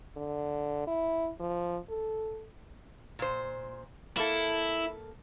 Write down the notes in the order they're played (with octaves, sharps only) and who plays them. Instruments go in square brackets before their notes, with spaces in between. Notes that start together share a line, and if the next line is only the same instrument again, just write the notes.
[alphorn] D3
E4
F3
A4
[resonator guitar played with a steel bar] A#2 C5
[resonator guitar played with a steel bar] A#3 A4 [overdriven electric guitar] E4